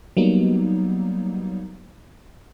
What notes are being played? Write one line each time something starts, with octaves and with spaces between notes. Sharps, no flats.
F#3 G3 A#3 B3 D#4